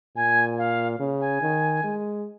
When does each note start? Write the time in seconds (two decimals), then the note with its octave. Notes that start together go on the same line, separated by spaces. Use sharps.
0.16 A#2 G#5
0.58 F5
0.99 C#3
1.21 G#5
1.42 D#3
1.83 G#3